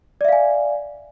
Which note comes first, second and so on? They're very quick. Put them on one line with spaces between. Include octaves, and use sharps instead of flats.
D5 E5 F5 G#5